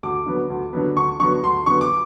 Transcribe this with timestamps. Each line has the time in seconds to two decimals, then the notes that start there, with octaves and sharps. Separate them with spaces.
0.03 D2 D6
0.26 D3 F#3 B3
0.50 D2
0.73 D3 F#3 B3
0.96 D2 C#6
1.20 D3 F#3 B3 C#6
1.43 D2 C6
1.66 D3 F#3 B3 C#6
1.81 D6